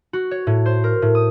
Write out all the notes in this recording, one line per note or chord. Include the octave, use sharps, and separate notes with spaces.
F#4
C#5
A2
C5
A#4
A2
D#6